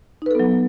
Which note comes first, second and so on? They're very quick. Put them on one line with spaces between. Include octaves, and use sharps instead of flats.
D#4 B4 A4 B3 F#3